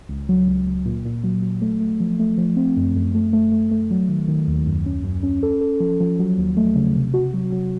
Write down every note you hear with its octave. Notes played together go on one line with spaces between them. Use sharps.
C#2
F#3
C#2
C#2
A#2
A#2
F#3
F#3
A3
A3
F3
A3
F3
C4
F#2
F#2
A3
A3
A3
A3
F#3
D#3
D#3
D#2
F#2
C#4
F#2
C#4
A4
A4
F3
F3
F#3
D#2
A3
C#3
C3
F#4
F#3
F#3